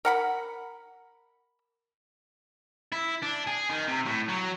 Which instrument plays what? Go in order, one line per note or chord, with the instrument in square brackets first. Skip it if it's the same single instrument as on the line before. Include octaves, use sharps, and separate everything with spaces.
[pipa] A#4 F#5 B5
[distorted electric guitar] E4
D4
G#4
D#3
C3
A2
F#3